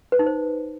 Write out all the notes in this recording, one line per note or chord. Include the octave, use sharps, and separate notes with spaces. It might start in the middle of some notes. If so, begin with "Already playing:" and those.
B4
D#4
C5